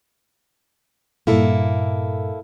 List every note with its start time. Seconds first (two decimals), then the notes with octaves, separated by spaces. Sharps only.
1.27 G2 A#2 A#3 E4 A4